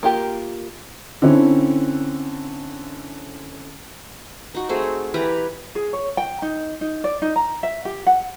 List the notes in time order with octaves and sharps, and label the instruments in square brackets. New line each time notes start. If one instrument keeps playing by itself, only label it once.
[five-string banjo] A#3 F4 G4 A#4
[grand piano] D3 C4 C#4 E4
[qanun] D#4 F#4
A3 C4 F#4 G#4
E3 G4 B4 A#5
[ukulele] G#4
C#5
G5
D#4
D#4
D5
D#4
A#5
E5
G4
F#5